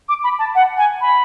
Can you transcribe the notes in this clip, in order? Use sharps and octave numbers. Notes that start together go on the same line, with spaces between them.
D6
B5
A5
F#5
G#5
B5